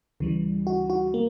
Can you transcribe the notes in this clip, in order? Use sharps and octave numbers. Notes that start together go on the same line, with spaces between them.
D2 C#3 E3 G3
F#4
F#4
A#3